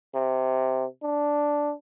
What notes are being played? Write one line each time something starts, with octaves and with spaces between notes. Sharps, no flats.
C3
D4